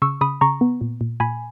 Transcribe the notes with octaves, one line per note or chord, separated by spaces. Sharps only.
C#3 C#6 E6
C#3 B5 D#6
C#3 A#5 C#6
B3
A#2
A#2
A#2 G#5 B5